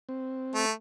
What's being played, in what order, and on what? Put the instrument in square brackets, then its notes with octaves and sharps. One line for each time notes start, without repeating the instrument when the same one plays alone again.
[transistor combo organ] C4
[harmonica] A3